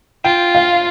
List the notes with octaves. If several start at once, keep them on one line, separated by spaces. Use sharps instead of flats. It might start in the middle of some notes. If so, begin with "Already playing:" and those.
F4 G5
F5